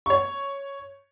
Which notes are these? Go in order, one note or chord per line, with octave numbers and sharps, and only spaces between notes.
C#5 C#6